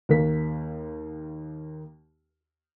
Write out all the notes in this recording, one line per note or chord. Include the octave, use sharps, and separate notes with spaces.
D#2 A#3 B6